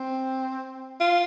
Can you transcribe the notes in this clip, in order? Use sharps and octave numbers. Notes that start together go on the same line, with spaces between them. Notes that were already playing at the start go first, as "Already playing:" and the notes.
Already playing: C4
F4